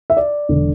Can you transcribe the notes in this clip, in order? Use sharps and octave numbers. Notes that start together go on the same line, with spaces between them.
E5
D5
E1 D3